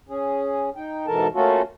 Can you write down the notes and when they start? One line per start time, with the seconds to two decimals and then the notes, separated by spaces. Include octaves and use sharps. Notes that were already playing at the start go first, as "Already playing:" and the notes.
0.09 C#4 G#4
0.76 D#4 G5
1.07 G#2 B2 E3 A4 A#4 A5
1.34 A3 A#3 C#4 F4 F#4 A4